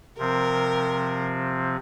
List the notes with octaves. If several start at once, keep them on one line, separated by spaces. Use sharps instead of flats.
C3 F3 C4 A#4